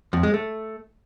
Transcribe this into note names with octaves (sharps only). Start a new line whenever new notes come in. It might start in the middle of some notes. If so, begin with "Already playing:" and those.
F2
G#3
A3